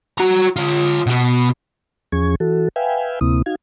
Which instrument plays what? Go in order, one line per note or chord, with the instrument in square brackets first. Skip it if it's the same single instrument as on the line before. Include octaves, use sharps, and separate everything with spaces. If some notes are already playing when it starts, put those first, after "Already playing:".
[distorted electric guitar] F#4 A#5
F4 C#5
B2 F#4
[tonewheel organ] E2 F3 C#4 G#4 C#6 G#6
E3 F#4 A4
B4 E5 F5 G5 G#5
D2 C3 A#3 C4 E4 D#6
D#4 F#4 F5 G#6